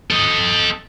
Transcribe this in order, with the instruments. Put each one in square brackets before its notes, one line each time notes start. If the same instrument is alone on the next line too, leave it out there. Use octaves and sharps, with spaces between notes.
[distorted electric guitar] A4 D#5